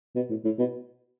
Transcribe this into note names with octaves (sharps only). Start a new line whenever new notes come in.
B2
A2
A2
B2